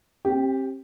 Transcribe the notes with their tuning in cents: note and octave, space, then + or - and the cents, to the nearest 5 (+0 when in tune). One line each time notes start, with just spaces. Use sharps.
C4 +35 G4 +0